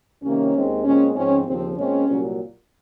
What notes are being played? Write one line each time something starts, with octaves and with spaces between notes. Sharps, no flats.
C2 C3 D#3 A#3 C#4
D#2 D#3 G#3 C4
A#2 G#3 C4 C#4
G#2 F3 C4 C#4
D#2 C#3 F3 C4
A#2 G#3 C4 C#4
C2 A#2 F#3